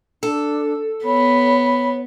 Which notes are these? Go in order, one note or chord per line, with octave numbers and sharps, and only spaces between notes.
D4 A4
B3 C#5 B5